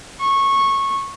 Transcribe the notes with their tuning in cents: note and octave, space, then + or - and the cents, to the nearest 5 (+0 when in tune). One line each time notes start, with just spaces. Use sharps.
C#6 -15